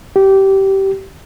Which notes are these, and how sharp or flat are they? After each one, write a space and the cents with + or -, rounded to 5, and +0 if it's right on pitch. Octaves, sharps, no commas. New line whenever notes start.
G4 -20